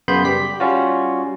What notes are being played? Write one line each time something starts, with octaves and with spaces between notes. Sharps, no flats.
F#2 C#3 B3 B5 C6 G6
G3 G4 B6
G3 C#4 F4 F#4